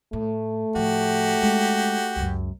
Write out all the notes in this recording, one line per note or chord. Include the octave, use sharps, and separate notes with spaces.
A2 A3
A2 F3 F#4 G4
G#3 C#4
C#2 F#2